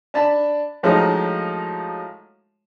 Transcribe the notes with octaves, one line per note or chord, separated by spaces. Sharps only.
D4 A5 B5
A2 F3 F#3 G#3 D#4 F4